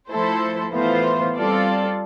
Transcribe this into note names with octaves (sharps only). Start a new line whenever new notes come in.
F3 A3 E4 A4 C5
A2 E3 B3 F4 C5
G3 C4 F4 A4 D5